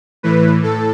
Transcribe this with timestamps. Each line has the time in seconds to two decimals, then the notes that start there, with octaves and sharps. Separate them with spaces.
0.23 A2 E3 B4
0.63 A2 A4